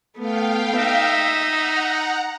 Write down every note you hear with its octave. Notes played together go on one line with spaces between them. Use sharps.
A3 B3 F5 G5
D#4 E5
F#5 A#5